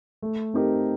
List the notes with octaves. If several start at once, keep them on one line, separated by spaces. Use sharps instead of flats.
A3
C4 D#4 G4 A#4